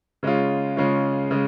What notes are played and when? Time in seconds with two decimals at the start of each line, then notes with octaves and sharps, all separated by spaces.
0.23 C#3 G#3 C#4 F4
0.77 C#3 G#3 C#4 F4
1.31 C#3 G#3